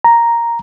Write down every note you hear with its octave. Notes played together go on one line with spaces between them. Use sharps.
A#5